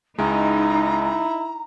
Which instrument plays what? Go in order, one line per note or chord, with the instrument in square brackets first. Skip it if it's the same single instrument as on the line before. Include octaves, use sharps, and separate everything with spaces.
[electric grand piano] C#2 G#3 [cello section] D#4 [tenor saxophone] E4 [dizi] A#5